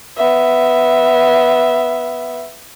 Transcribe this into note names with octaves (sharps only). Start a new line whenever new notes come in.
B3 E5